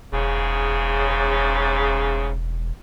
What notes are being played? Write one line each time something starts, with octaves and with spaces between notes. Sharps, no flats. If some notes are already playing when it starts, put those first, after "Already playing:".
E1 G#2 C#3